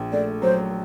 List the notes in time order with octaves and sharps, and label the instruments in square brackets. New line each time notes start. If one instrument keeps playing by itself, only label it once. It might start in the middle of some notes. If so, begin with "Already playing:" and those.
Already playing: [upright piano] A#1
[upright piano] A3 [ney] D5
[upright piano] F#3 [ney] C5